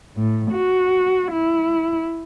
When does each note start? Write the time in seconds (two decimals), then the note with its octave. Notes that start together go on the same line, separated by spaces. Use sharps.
0.15 A2
0.50 F#4
1.31 E4